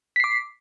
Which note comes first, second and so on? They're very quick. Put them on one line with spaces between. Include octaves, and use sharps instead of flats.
B6 C7 D6